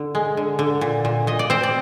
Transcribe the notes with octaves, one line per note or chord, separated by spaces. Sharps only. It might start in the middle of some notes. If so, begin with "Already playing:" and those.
Already playing: D3
G#3
D3
D3
A#2
A#2
A#2 D#5
D5
C4 C5
D5